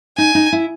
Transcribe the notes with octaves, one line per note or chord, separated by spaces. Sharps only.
D#4 G#5
D#4
E4